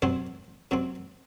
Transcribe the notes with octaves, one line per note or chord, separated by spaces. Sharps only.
C3 F#3 C4 C5
C3 F#3 C4